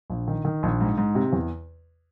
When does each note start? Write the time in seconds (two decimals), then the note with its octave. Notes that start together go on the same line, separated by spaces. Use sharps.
0.10 A#1
0.28 D#3
0.45 D#3
0.63 A#1
0.81 G#2
0.97 G#2
1.15 C3
1.33 E2